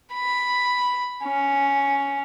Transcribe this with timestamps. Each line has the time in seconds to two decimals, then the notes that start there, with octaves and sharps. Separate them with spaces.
0.14 B5
1.24 C#4